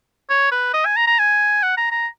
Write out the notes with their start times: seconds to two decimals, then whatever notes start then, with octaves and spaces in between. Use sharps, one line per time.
0.30 C#5
0.52 B4
0.73 D#5
0.85 G#5
0.96 A#5
1.07 A#5
1.19 G#5
1.63 F#5
1.77 A#5
1.91 A#5